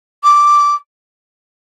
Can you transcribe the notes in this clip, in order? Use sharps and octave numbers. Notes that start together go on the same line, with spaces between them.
D6